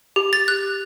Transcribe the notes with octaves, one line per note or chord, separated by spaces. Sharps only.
G4
A6
F#6